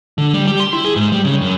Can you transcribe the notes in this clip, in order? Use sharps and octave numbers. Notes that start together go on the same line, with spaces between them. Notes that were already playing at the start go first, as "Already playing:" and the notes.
D3
G3
G4
C6
E4
G#4
G#2
G3
C#3
F#2